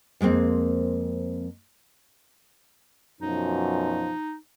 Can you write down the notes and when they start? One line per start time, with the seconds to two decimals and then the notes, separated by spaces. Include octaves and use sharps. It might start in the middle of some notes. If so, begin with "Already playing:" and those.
0.21 F2 G#3 A#3 C4
3.21 F#2 B2 F3 D#4